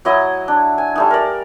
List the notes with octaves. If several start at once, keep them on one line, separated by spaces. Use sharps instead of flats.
F#3 E4 D#5 D#6
D4
G#5
G3 A3 D#4
A#4 D5